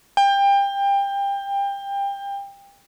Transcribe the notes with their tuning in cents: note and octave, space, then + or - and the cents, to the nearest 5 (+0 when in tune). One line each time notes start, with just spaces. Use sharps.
G5 +25